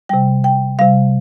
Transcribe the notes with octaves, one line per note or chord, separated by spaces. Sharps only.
C3 G3 G5
G5
C3 G3 F5